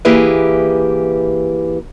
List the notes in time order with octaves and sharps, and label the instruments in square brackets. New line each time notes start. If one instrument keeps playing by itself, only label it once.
[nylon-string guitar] E3 A#3 E4 G4 G#4 B4